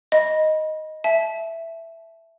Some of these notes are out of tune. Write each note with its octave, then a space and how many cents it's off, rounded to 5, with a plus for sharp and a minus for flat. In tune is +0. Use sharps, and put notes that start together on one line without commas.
D#5 +0 B5 -30
E5 +5 A5 -30